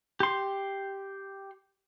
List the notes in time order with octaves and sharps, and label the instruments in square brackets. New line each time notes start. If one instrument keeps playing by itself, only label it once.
[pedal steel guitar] G4 C6